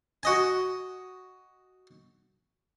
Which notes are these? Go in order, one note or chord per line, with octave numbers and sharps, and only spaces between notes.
F#4 D#5 G#5